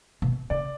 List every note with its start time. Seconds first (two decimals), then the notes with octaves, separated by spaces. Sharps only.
0.22 B2
0.50 C#3 D5